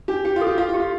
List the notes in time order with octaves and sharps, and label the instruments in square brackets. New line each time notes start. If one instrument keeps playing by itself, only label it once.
[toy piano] D4 [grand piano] G4
[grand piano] G4 [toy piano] G5
[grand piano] F4
[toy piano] A4
[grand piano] G4
[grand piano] F4 [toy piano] F5
[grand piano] F4
[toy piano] G4
[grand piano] F4